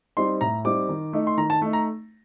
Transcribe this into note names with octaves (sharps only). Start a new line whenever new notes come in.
G3 C4 D#4 C6
A2 A#5
G3 C4 D#4 D6
D#3
A3 D#4
C6
D#3 A#5
A5
A3 D#4
A#5